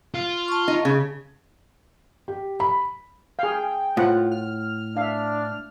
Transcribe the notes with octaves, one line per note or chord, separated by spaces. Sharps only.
F4
A5 C#6
D#4
C#3 G#4
G4
B5
G#4 F5 G5
A2 F4 C5 F#5
F6
D4 E5 F5